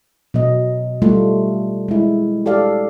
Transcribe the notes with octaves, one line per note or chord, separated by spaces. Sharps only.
B2 F#3 D#5
G3 A3 F4
G#3 E4
G4 A4 D5 F5